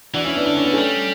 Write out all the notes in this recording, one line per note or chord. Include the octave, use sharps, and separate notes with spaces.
E3 D4 F#4
C#4 E4
B3 D4
D3 D4
C#4
B3
G3 A3 C#4